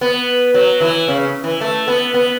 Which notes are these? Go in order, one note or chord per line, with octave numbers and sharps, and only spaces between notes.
B3
F#3
E3
C#3
E3
A3
B3
B3